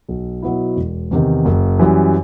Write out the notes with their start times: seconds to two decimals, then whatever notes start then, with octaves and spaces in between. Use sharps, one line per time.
0.09 B1
0.42 B2 F#3 B3 E4
0.76 E1
1.11 E2 C3 D#3
1.45 F#1
1.79 F#2 E3 G3